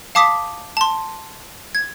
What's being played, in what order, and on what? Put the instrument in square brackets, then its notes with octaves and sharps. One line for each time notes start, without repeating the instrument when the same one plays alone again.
[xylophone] F5 A5 D6 D#6 B6
A5 C6
G#6